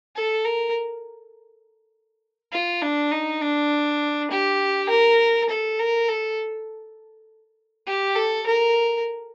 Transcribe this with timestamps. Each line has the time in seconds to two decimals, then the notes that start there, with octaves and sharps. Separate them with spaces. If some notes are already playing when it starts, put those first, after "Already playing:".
0.15 A4
0.45 A#4
2.52 F4
2.82 D4
3.12 D#4
3.41 D4
4.31 G4
4.89 A#4
5.49 A4
5.79 A#4
6.08 A4
7.87 G4
8.15 A4
8.46 A#4